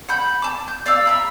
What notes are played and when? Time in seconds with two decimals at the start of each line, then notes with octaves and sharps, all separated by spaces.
0.08 F#5 B5 G6
0.42 A5 D6
0.68 G6
0.86 D5 F5 D6 E6
1.06 E5 A#5 B5